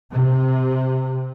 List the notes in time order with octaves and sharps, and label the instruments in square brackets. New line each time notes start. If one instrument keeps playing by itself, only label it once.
[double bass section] C3